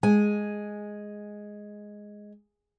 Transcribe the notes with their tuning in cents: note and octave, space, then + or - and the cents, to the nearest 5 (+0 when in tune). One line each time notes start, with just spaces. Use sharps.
G#3 +0 G#5 +0